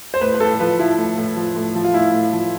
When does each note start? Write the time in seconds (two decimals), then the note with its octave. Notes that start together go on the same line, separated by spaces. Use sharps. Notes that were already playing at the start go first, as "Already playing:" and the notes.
0.14 C5
0.21 A2 B4
0.34 B4
0.40 A2 A4
0.60 F3 B4
0.79 F3 E4
0.98 A2
1.18 A2
1.36 F3
1.56 A2
1.75 F3
1.84 F4
1.94 A2 E4
2.13 A2
2.33 F3